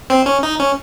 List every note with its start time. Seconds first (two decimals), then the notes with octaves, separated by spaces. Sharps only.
0.10 C4
0.26 C#4
0.43 D#4
0.60 C#4